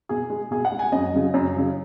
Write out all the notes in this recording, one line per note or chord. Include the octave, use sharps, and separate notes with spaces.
B2 G#4
G#3
B2 G#4
F#5
G#3
G#5
F#2 D#5
C#3 F#3
F#2
C#3 F#3